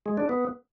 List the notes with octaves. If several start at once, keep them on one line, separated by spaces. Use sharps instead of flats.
G#3
D4
B3